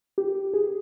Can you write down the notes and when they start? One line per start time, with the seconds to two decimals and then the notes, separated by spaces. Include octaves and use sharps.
0.18 G4
0.53 G#4